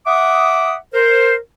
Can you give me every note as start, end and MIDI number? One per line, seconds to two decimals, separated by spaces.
0.06 0.75 76
0.06 0.75 78
0.06 0.75 86
0.06 0.75 87
0.93 1.35 70
0.93 1.35 72